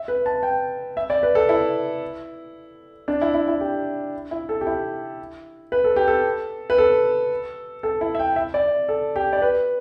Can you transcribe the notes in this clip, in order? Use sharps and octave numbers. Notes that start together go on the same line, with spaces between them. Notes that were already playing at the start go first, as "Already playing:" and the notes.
Already playing: E5
B4
A5
G5
E5
D5
B4
A4
E4
D4
E4
E4
E4
G4
E4
A4
G4
E4
B4
A4
G4
A4
B4
A4
A4
E4
E5
G5
E5
D5
A4
G4
D5
B4